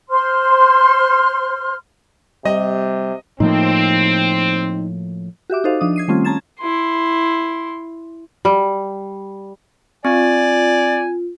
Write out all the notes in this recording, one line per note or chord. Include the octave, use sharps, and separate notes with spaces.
C5 C6 F6
C3 G3 D#5
A2 F3 A#3 C4 D#4
F#4 G4 E5 D6
D#4 F#4 A4 C5 D#5 F5
F3 D4 D#6
G#6 C7 D#7
D#3 G3 A3 C4 C#4 F4
C#4 A5 A#5 G#6 A6 E7
E4 C6
G3
C4 F4 D5 G#5